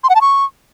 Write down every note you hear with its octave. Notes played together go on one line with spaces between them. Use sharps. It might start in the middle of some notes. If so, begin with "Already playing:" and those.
C6
F#5
A5
C#6